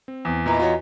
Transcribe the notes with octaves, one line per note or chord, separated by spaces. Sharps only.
C4
E2
A#2 E3 E4 D#5 A#5
F4 F#4 C#5